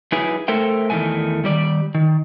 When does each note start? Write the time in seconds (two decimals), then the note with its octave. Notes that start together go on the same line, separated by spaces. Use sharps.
0.12 F#3 D#4 E4 G#4 B4 G#5
0.48 A3 A4 A#4 C5 E5 G5
0.90 E2 D#3 E3 G#3 A3 G#5
1.44 D#3 G3 D5
1.95 D#3